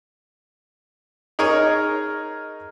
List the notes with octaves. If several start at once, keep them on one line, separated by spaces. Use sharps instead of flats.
D#4 G#4 A#4 C#5